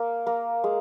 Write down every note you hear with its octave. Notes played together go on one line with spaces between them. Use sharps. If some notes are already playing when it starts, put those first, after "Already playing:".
Already playing: A#3
A#3
G#3